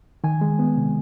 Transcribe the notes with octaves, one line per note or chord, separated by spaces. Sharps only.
D#3 G#5
G#3
B3
C3